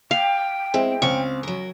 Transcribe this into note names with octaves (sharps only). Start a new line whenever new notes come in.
F5 G5
G#3 C4 E4 C5
C#2 C4 F5 C#6
F#3 A#4